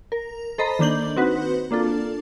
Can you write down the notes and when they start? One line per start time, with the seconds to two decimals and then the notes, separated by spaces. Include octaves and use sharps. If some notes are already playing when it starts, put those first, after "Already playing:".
0.12 A#4
0.58 A4 C5 D#5 A#5 B5
0.79 D#3 A#3 D4 G6 F#7
1.16 C4 D#4 F#4 B4
1.71 A#3 D4 F4 A4